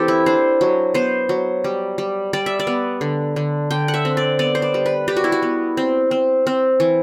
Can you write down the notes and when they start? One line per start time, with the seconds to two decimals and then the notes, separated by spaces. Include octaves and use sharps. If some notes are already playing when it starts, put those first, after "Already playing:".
Already playing: E3 C4 G4 A4
0.08 E4
0.26 D4 C5
0.61 F#3
0.94 B3 C5
1.29 F#3
1.64 G3
1.98 G3
2.33 G3 D5
2.46 E5
2.59 D5
2.67 B3
3.01 D3
3.36 D3
3.71 D3 G5
3.88 F#5
3.94 E5
4.05 C4
4.17 D5
4.39 B3 D5
4.55 C5
4.62 D5
4.74 G3
4.86 B4
5.08 G3 G4
5.16 F#4
5.24 E4
5.32 F#4
5.42 B3
5.77 C4
6.11 C4
6.47 C4
6.80 E3